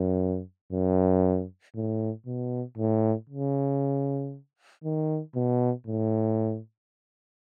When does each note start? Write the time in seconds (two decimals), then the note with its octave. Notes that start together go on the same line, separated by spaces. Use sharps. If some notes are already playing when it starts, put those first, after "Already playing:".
Already playing: F#2
0.72 F#2
1.75 A2
2.26 B2
2.78 A2
3.29 C#3
4.84 D#3
5.35 B2
5.87 A2